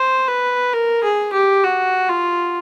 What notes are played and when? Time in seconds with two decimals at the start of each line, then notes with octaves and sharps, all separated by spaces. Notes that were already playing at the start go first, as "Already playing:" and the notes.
Already playing: C5
0.28 B4
0.73 A#4
1.03 G#4
1.33 G4
1.64 F#4
2.09 F4